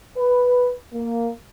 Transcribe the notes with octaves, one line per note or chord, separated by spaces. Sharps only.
B4
A#3